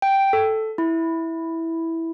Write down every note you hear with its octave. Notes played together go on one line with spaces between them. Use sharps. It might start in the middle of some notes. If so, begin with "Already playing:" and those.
G5
A4
E4